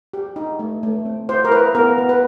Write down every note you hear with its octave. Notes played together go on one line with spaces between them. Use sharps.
G4
D#4
A3
A3
C4
E4 C5
A#4
E4 B4
B3 A#4
B3
B4